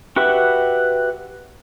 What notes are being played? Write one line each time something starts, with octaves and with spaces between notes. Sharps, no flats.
F#4 G4 B4 E5 C#6